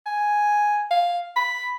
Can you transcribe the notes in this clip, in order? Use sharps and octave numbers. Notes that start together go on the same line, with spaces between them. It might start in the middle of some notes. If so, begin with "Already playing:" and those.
G#5
F5
B5